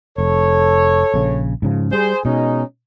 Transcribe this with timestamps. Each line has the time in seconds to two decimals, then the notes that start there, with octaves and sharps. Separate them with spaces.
0.18 F1 A4 C#5
1.14 A#1 C#3
1.62 G#2 C#3 F3
1.92 G3 G#4 C5
2.25 B2 G#3 C#4 D#4